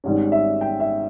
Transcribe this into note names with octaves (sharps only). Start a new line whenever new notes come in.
G#1 G#2 G3 C#4
E5
G5
E5